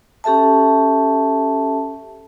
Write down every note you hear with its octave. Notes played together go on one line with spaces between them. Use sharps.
C#4 G4 A4 E5 A5